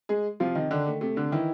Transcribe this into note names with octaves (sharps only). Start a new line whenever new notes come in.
G#3 G#4
C3 F3 F4
D#3 D#4
D3 D#3 D4
A3
C3 A3
D3 D4
D#3 E3 E4